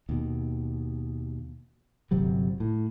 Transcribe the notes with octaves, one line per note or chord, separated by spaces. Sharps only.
D#2 B2
G1 C3 F#3 G3
A2